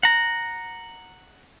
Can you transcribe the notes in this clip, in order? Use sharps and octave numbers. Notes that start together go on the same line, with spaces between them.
F#5 A#5